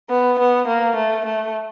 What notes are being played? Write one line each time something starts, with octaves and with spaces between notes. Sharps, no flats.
B3
B3
A#3
A3
A3